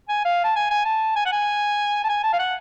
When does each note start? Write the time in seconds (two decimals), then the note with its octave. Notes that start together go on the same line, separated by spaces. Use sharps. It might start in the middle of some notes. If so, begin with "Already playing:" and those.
0.09 G#5
0.25 F5
0.44 A5
0.56 G#5
0.70 G#5
0.85 A5
1.16 G#5
1.26 F#5
1.32 G#5
2.04 A5
2.09 G#5
2.24 A5
2.33 F5
2.39 F#5